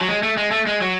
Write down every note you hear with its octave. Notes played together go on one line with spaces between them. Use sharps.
F#3
G#3
A3
G#3
A3
G#3
F#3